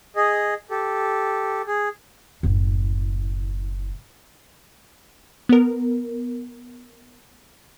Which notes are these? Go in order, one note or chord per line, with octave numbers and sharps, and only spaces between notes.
G#4 D#5
G4 A4
G#4
F#1 A2
B3 A#4